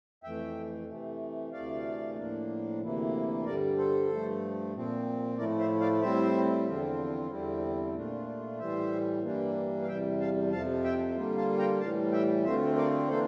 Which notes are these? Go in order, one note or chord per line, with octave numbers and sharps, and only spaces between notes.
F2 E3 A3 E5 G5
C3 E3 A3
D2 C3 E3 A3 D5 F5
A2 F3 A#3 D4
D2 C3 E3 A#3 E4
G2 D3 G3 A#4 D5
A4 C5
G2 F3 A3
A#2 F3 C4
A2 F3 A3 E4 A#4 D5
C5 E5
D5 F5
A2 G3 C4 E4 C5 E5
E2 D3 F3 C4 F4
E2 D3 G3 C4 E4
A#2 A3 D4 F4
A2 E3 G3 C5 E5
G2 E3 G3 A#3 D4
F5
E2 C3 G3 E5 G5
F5 A5
F2 C3 F3 F5 A5
E5 G5
D3 G3 A#3 F4
F5 A5
G5 A#5
A2 E3 G3 F5 A5
E5 G5
D2 D3 A3 C4 F4 C5 E5
A#4 D5
E3 A#3 D4 A4 C5